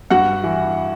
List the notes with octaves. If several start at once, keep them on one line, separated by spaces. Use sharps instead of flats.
G2 F#4 F#5
E3